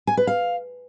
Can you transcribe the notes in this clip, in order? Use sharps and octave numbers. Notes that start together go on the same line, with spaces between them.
G#5
B4
F5